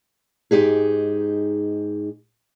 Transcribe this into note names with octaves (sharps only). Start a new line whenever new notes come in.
G#2 D#4 G4 G#4